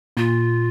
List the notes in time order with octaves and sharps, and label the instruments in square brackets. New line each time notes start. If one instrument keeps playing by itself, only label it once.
[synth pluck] A#2 [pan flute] F4